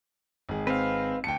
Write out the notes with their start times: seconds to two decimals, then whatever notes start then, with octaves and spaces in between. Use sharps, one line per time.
0.49 G#1 G#4
0.67 C4 B4 F5
1.24 D2 G5 A5 C#7